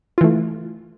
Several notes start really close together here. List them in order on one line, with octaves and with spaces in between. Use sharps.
F4 E3 A3